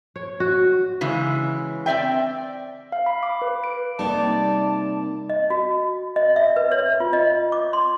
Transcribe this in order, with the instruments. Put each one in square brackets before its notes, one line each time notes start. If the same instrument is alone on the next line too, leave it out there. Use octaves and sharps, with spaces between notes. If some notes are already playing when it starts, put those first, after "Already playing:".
[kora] C#5
F#4
[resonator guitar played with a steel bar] C#3 E3 G#3
C4 D5 E5 G5
[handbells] F5
B5
D6
B4
D7
[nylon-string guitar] C3 A#3 D#4 [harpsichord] G3 [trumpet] D5 [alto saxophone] A5
[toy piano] D#5
F#4
D#5
E5
B4
C#5
F4
D#5
D6
C6